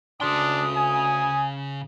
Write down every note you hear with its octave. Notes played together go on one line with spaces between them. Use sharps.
D2 C#3 D4 C6 D#6
G#5